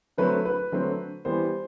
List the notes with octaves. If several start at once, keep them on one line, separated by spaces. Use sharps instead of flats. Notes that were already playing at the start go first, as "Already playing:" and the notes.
D3 F#3 A3 C4 B4
B4
D3 F#3 A3 C4
E3 G3 B3 C5